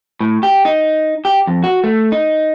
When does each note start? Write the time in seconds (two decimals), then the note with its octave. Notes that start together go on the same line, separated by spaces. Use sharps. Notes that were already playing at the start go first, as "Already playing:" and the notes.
0.21 A2
0.43 G4
0.65 D#4
1.25 G4
1.47 F2
1.63 F#4
1.84 A3
2.12 D#4